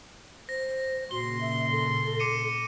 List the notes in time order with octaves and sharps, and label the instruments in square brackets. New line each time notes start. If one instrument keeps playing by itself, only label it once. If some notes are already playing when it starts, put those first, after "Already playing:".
[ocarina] C5 [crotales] A#6
[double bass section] A#2 C#3 [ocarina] F#4 [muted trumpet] C6 [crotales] G7
[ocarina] E5
A4
[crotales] D6 C#7 D#7